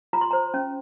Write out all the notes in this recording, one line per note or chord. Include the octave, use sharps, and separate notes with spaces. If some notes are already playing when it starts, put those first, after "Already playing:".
F4 A#5
C6
C5 A#5
C#4